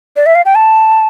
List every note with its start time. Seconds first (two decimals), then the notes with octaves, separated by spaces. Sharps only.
0.16 D5
0.26 E5
0.35 F5
0.45 G5
0.55 A5